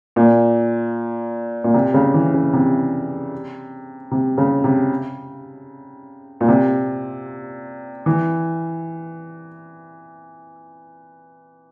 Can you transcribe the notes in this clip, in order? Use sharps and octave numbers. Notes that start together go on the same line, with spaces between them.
A#2
A#2
C3
C#3
E3
C#3
C3
C3
C#3
C3
A#2
C3
E3